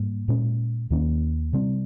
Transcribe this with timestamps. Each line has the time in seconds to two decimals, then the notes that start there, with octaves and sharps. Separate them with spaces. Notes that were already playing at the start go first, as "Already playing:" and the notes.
Already playing: G#2 G3 A#3
0.28 A#2 G#3 C#4
0.90 D#2 D#3 A#3 C#4
1.53 C3 G3 C4